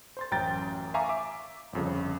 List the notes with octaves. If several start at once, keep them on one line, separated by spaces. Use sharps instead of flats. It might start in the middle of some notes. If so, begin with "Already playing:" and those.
C5 C6 A6
A1 F#2 G5 A#5 G6 A6
E5 F5 G#5 A#5 C#6 D6
E5 D6
G1 F2 C#3